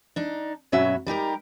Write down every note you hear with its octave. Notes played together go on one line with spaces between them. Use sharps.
D4 D#4
G2 B2 F#3 C#4 F#4 E5
G3 D#4 G4 A#4